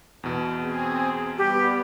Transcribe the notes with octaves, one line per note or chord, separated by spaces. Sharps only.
E2 B2
C4 G#4
G3 B3 G4